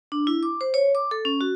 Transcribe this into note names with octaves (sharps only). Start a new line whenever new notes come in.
D4
E4
D6
C5
C#5
D6
A4
C#4
F#4